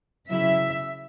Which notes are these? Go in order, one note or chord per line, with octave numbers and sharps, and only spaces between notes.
C#3 F#3 C#4 E4 E5